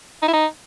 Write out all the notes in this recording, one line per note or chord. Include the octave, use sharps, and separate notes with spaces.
D#4
E4
D#4